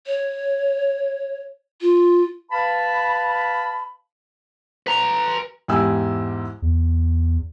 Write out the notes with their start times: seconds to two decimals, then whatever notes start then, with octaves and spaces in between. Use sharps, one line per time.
0.07 C#5
1.81 F4
2.51 B4 F5 A5 B5
4.87 B4 A#5
5.68 E2 G#2 E4 G4 G#5 E6
6.62 E2